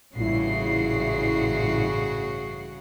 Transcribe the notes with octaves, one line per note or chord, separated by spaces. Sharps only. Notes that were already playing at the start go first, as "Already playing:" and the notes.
A1 G2 A#2 C#3 E4 F#4 G#4 C7